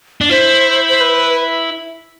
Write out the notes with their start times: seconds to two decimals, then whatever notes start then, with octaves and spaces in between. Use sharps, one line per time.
0.21 D4
0.29 E4 C5
0.89 C5
1.01 B4